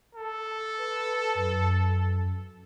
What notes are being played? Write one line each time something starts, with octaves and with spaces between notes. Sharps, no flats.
A4
B4
F#2